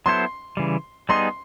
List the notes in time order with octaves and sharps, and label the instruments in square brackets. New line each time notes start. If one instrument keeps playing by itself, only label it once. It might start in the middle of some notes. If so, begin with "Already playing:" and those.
[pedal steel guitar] F#3 B3 E4 A4 C5 [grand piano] C6
[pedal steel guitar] C#3 E3 G3
[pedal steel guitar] G3 B3 D#4 G#4 [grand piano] C6